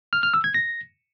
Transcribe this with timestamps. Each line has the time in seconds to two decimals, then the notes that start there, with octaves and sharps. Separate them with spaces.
0.13 F6
0.23 F6
0.34 E6
0.44 G#6
0.54 A#6